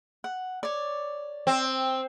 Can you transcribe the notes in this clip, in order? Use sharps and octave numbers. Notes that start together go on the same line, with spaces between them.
F#5
C#5 D5
C4